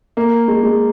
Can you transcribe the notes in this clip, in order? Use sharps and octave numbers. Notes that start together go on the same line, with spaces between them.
A#3
G#3
G#3